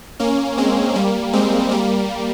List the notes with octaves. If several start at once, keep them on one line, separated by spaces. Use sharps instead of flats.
A#3 C#4
G#3 C4
G3 A#3
G#3 C4
G3 A#3